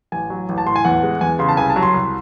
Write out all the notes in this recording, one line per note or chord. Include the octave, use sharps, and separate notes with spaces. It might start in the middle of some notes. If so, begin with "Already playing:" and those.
A1 G#5
F#3
A1
A5
A2 C6
G#5
E2 F#5
G#3
E2 G#5
C#3 C6
A5
C2 G#5
A5
F#3
C6
C2